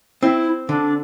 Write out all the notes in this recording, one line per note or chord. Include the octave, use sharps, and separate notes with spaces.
C4 E4
D3 D4